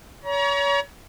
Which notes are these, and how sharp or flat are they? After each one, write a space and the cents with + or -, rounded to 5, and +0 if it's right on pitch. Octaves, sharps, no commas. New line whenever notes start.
C#5 +30 A#5 +35